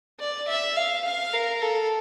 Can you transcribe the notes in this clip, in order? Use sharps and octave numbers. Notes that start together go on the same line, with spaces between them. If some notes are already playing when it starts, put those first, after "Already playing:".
D5
E5
F5
F5
A#4
A4